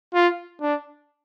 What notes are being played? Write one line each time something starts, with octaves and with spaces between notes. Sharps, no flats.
F4
D4